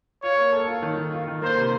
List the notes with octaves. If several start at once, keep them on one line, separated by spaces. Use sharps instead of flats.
F4 C#5
A#3
A4
F4
D#3
D#3
F4
D#3
A#3 C5
C3